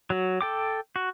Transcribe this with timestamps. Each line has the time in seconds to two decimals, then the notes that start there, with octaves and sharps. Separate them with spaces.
0.10 F#3 F#4
0.41 A4 G5 D6
0.96 F#4